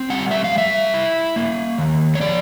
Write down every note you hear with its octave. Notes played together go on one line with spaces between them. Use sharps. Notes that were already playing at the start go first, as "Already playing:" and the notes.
Already playing: C4
G3 F#5
E5
F5
G3
E5
E4
A#3
D#3
C#5
F3 D5